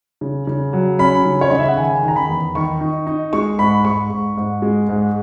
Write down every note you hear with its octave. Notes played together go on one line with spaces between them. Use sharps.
C#3
C#3
F#3
C#4 B5
C#3
C#5
C#3 D#5
E5
F#5
D#3 G#5
D#3
A#5
B5
E2
D#3 C#6
D#4
D#4
G#3 C#6
G#2 B5
G#2 C#6
G#2
G#2
G#3
G#2